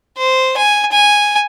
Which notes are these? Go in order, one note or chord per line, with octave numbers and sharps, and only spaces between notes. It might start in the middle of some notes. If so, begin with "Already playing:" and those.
C5
G#5
G#5